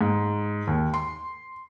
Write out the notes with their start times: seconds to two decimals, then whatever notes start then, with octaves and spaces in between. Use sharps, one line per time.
0.01 G#2
0.67 D#2
0.94 C6